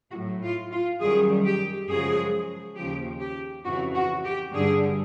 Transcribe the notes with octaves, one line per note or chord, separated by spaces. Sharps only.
A2 F#3 F#4
F4
F4
F#2 D#3 G3 G#4
G4
F#2 C#3 F3 G#3 G#4
D#2 C#3 F3 G4
G4
F2 C#3 E3 F#4
F#4
G4
G2 D3 G3 G#4